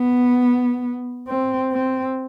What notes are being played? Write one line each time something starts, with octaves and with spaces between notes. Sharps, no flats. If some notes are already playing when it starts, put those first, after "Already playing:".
Already playing: B3
C4
C4